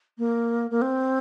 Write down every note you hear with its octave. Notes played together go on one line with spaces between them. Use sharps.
A#3
A#3
C4